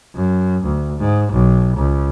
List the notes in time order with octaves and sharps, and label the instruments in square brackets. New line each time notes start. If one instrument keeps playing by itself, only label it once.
[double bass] F#2
D2
G#2
B1
C#2